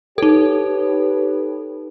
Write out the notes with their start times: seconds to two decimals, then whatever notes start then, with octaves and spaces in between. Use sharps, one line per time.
0.18 D#4 G4 A4 B4 C#5